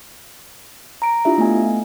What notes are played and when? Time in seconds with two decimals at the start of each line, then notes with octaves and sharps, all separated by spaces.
1.02 A#5 D7
1.25 D4 E4 F4 G4 E5
1.38 A3 B3 G#5